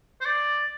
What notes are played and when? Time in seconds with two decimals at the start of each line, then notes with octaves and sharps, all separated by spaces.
0.21 C5
0.25 D5